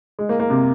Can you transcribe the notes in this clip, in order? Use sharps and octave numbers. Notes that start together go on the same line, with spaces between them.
G#3
A#3
A#3
C3